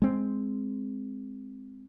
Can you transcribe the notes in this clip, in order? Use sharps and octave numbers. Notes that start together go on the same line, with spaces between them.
G#3 C4